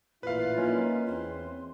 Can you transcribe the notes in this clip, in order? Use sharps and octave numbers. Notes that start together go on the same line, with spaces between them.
A1 A#2 E4 F4 B4 F5
A#3 C#4 D#4 E4
E2 C4 C6